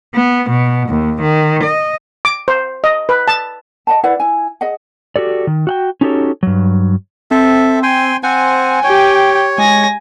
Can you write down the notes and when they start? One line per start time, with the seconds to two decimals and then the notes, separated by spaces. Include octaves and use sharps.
0.15 B3
0.50 B2
0.89 D#2
1.22 D#3
1.63 D#5
2.25 D6
2.48 C5
2.84 D#5
3.09 B4
3.28 A5
3.87 D#5 F#5 A5
4.03 E4 B4 D5 F#5
4.20 E4 G#5
4.61 G#4 D#5 F#5
5.16 F#4 G4 A4 D5
5.47 D#3
5.67 F#4 F#5 G5
6.01 C#4 D#4 F#4 G4 A4 C#5
6.43 G2 F#3
7.31 C4 A4 E5
7.83 G5 G#5 C6
8.23 C4 C5 F#5 G#5
8.84 G4 C#5 G5
9.58 G#3 G#5 A#6